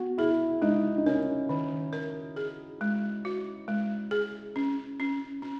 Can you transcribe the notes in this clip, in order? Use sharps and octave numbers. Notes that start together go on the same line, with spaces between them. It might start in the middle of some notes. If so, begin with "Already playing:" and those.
Already playing: B3 F#4
E4 G#4
G#3 D#4
D#4
C#4 A#4
D#3
A#4
G#4
G#3
F#4
G#3
G#4
C#4
C#4
C#4